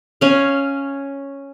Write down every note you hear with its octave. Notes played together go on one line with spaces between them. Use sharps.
C#4 F5